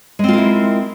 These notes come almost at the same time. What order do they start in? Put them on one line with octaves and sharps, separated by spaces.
G#3 C4 F4 A#4 E4